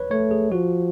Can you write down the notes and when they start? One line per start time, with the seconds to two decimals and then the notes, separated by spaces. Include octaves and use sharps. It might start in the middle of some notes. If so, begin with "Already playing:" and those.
Already playing: B4 C#5
0.11 A3 C#5
0.31 G#4
0.51 F3 F#4